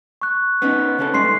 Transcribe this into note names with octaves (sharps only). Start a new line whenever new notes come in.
C#6 F#6
B3 C#4 D#4
C#3 C#4 A4
G2 G#3 A3 C6 C7